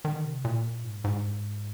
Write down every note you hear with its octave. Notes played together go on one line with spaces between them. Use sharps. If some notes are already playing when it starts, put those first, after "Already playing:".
D#3
C3
A#2
G#2
G#2